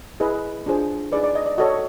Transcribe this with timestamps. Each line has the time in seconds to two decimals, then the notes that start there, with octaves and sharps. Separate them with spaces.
0.20 E4 G#4 B4 D#5
0.66 D4 F4 G#4 C5
1.12 D#4 G#4 B4 D5
1.24 D5
1.35 D#5
1.46 D5
1.58 F#4 A4 C#5 D#5